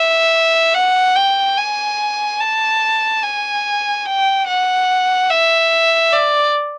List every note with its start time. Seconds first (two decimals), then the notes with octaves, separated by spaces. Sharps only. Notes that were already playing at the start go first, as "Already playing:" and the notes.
Already playing: E5
0.74 F#5
1.16 G5
1.58 G#5
2.40 A5
3.23 G#5
4.06 G5
4.47 F#5
5.30 E5
6.13 D5